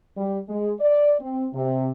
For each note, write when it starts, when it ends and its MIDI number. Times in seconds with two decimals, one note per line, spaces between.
0.17 0.39 55
0.49 0.72 56
0.80 1.14 74
1.20 1.47 60
1.53 1.91 48